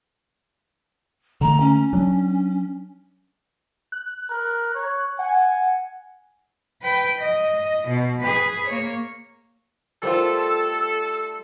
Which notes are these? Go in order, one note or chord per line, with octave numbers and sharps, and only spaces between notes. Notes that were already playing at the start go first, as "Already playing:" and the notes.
D3 A3 A#5
C#4
F#3 D4
F#6
A#4
C#5
F#5 G#5
B4 G5
D#5
B2
G#4 B4
A#3 C#5
G3 A3 F4 A4 A#4 C5